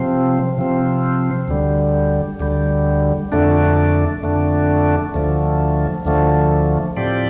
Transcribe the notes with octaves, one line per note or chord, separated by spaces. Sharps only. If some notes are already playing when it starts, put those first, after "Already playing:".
Already playing: C3 F3 C4
C3 F3 C4
D2 D3 G3
D2 D3 G3
F2 D3 A3 D4
F2 D3 A3 D4
D2 D3 F3 A3
D2 D3 F3 A3
A2 F3 C4 G4 D5